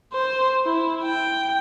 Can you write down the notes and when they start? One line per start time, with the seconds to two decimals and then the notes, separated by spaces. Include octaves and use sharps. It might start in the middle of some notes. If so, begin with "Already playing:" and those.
0.13 C5
0.65 E4
1.03 G5